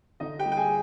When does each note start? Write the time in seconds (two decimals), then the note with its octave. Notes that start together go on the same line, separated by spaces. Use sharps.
0.20 D3 D#4 D#5
0.39 G4 G5
0.45 G3
0.52 G5
0.57 G#4 G#5